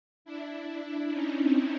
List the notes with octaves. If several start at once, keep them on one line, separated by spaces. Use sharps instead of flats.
D4 E4
C#4 D#4
C4 D4